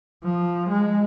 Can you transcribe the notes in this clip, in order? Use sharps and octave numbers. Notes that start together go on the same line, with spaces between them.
F3
G#3